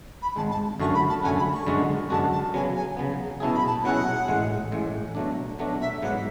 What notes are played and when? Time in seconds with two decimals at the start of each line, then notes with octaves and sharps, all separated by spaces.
0.21 B5
0.36 G#1 G#2 G#3 A5
0.50 A5
0.80 F#2 D3 A3 C#4 F#4 C#6
0.94 B5
1.09 A5
1.23 F#2 D3 A3 C#4 F#4 G#5
1.38 B5
1.52 C#6
1.67 F#2 D3 G#3 D4 F#4
2.10 F#2 D3 G#3 D4 F#4 A5
2.32 A5
2.54 C#3 F#3 B3 G#5
2.76 G#5
2.97 C#3 F#3 B3
3.40 B2 F#3 C#4 E4 G#4 A5
3.53 B5
3.65 A5
3.84 B2 F#3 C#4 E4 G#4 F#5
4.27 A1 A2 G#3
4.72 A1 A2 G#3
5.15 B2 F#3 A3 D4
5.59 B2 F#3 A3 D4
5.80 E5
6.02 G#2 F#3 B3 F#5